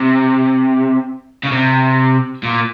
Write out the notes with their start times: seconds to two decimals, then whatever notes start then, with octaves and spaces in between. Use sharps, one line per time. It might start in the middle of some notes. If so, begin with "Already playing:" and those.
Already playing: C3
1.43 C#3
1.52 C3
2.43 A#2